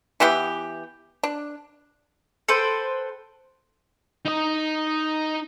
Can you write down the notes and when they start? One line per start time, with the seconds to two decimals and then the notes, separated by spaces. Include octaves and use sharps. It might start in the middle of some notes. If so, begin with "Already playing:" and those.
0.20 E3 B3 E4 G4
1.23 D4
2.48 A4 B4 C5 G5
4.25 D#4 D#5